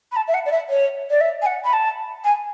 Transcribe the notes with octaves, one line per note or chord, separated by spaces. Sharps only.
B5
A5
E5
F#5
D5
E5
C#5
D5
E5
G#5
F#5
B5
A5
G#5